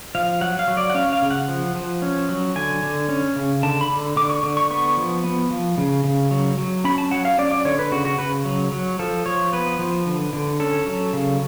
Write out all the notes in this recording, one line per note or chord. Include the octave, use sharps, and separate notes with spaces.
F3 F5
F#3 F#5
F5
F#3
D5
F#5
C#4 F5
F5
C#3
F#5
F3
F3
C#4
F#3
D3 G#5
D3
C#4
C#3
D3 A5
B5
D3
D3 D6
C#6
D3
C#6
B3 C#6
F3
B3
F3
C#3
C#3
F#3
F#3
C#4 B5
A5
F#3 F#5
F5
C#4 D5
D5
D3 C#5
B4
C#3 F#4
F#4
C#3 B4
F#3
F#3
F3 A4
F3 C#5
B3 B4
F3
D3
D3
C#4 A4
F#3
C#3